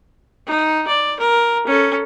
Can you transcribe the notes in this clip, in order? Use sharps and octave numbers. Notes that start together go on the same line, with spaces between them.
D#4
D5
A#4
C#4 A4